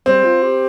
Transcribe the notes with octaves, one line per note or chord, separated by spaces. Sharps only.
G3 C4
F4
G4